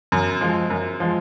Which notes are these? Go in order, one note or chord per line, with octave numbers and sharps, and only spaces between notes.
F#2
F3 G#3
F#2
F3 G#3